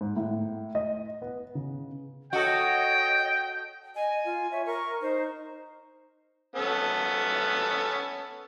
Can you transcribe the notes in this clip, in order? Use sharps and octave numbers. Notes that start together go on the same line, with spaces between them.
G#2
A2
D#5
B3
C#3
F#4 A4 C#5 D#5 G5
D#5 G#5
F4
C#5 E5
A#4 C#6
D#4 C5
B3 C#4 A4